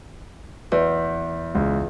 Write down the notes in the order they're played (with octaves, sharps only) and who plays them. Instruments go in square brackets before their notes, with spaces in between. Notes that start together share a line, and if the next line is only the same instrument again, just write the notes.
[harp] E2
[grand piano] C#2